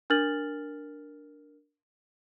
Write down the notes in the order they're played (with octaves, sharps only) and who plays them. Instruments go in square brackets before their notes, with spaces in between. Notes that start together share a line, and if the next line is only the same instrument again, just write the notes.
[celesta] D4 A#4 F6 A6 F#7